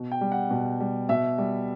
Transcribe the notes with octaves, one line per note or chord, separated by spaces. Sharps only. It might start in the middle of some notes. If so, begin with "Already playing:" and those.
Already playing: B2
G5
G3
F#5
B2
G3
B2 E5
G3